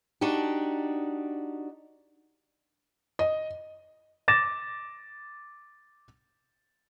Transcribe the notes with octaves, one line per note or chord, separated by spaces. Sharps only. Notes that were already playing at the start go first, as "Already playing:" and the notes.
D4 D#4 F#4 G4
D#5
D6 A6 A#6 E7